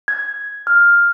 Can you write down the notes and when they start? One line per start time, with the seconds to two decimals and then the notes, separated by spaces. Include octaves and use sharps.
0.08 G#6
0.67 F6